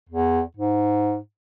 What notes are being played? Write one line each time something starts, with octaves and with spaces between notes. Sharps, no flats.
E2
G#2